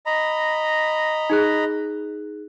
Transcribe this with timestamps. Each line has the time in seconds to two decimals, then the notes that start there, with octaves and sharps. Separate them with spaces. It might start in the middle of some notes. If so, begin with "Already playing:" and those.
0.06 D#5 A#5 B5
1.30 D#4 G#4 F#6